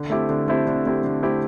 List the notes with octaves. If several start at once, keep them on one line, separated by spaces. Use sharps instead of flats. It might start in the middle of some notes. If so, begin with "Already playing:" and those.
Already playing: D3
A3 C4 E4 G4
D3
A3 C4 E4 G4
D3
A3 C4 E4 G4
D3
A3 C4 E4 G4